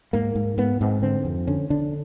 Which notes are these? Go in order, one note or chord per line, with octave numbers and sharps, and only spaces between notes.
G#2 A#3
G#2
G#2 B3
G#2 C4
D3 C4
F2
D3 C#4
D3 D4